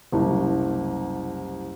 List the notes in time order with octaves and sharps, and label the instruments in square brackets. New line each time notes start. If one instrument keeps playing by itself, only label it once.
[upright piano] F#1 C2